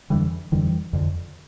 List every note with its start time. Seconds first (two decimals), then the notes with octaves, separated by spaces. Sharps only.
0.10 F2 D3 E3 G3
0.52 F2 D3 E3 G3
0.93 F2 D3